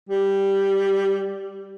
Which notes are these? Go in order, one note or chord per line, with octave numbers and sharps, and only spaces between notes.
G3